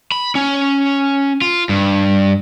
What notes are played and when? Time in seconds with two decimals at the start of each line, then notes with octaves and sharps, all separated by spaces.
0.12 B5
0.35 C#4
1.42 F4
1.69 G2